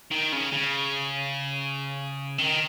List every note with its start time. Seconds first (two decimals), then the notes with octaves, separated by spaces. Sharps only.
0.11 D#3
0.33 C#3
0.53 C#3
2.38 D#3